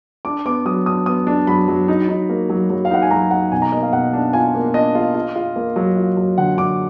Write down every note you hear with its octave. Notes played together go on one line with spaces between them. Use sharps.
D4 D6
B3 D6
F#3 D#6
D4 D#6
B3 D#6
D4
F#3 B5
F#3
D#4
D#4
A#3
F#3
F#3
F5
D#4 F#5
G#5
F#3 A#5
D#4 F#5
B2 G#5
A#5
A#3 D#5
F5
B2 F#5
D4
F4 G#5
A#3
D4 D#5
F4
F4
F4
A#3
F#3
F4
F#3
D3 F#5
D3 D6